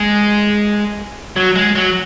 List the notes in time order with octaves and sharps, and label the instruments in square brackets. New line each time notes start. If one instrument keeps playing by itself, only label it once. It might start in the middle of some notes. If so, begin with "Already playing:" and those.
Already playing: [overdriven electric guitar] G#3
F#3
G#3
F#3